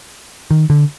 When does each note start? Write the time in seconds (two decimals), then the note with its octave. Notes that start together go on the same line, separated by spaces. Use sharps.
0.51 D#3
0.70 D3